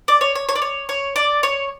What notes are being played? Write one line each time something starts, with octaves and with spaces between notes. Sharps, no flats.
D5
C#5
C#5
C#5
D5
C#5
C#5
D5
C#5